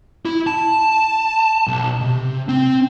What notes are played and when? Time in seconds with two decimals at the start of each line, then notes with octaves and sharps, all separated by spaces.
0.25 E4
0.47 A5
1.67 B1
2.01 C3
2.49 C4